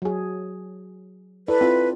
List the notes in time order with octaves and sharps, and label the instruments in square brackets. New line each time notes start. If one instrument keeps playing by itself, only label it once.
[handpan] F#3 G#4
[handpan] E4 A4 D5 [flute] B4
[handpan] C4 E4 F4